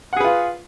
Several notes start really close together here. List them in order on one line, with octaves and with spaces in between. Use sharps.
F#5 G#4 B4 F4